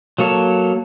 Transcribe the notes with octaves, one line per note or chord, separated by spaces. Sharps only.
F#3 A#3 A4 C#5